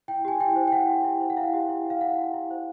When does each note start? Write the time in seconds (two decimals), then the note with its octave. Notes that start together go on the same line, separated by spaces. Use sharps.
0.08 E4 G5
0.25 G4 G#5
0.40 E4 G5
0.56 C5
0.67 G5
0.72 E4 F#5
0.89 G4
1.04 E4
1.20 C5
1.30 F#5
1.37 E4 F5
1.54 G4
1.69 E4
1.86 C5 F5
2.01 E4 F#5
2.18 G4
2.34 E4
2.50 C5